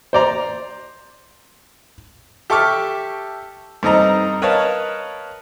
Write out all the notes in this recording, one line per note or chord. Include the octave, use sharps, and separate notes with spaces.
C5 D5 A#5
G4 A4 E5 C#6 D6 F6
G2 C4 D#4 A4 D#5 A#5
A#4 B4 C#5 D#5 F5 A5